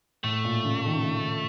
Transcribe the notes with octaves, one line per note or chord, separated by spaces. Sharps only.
A2 A3
A#2
C#3
D#3
C#3
D#3